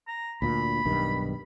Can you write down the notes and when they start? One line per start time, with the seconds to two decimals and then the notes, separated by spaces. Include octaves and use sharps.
0.07 A#5
0.42 D2 A#2 B5
0.85 B1 G2 D#3